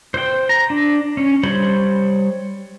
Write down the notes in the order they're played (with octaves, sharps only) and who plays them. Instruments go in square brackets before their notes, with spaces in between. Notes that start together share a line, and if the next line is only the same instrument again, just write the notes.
[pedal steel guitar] C5 G5
A#5
D4
C#4
G3 C5 C#5 B5 C6